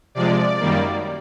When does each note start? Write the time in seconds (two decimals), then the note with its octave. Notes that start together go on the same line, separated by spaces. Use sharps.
0.15 C3 F3 G#3 D5
0.60 F#2 D#3 G3 A#3